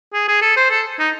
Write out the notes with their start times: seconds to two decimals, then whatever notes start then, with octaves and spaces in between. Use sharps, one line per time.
0.13 G#4
0.28 G#4
0.42 A4
0.57 C5
0.71 A4
1.00 D#4